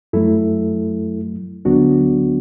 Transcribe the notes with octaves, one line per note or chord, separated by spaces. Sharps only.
F#2 F#3 A3 E4 A4
D2 D3 F#3 B3 D4 F#4